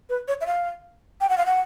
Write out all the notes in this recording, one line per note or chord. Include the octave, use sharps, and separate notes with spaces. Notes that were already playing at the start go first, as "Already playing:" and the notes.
B4
C#5
E5
F5
G5
F#5
F5
F#5